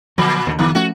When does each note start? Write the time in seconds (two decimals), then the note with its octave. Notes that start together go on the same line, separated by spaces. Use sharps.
0.18 A#2 D3 F3 F#3
0.47 D#2 D3
0.59 F#1 D#3 F3 B3
0.75 F3 A3 C#4 F#4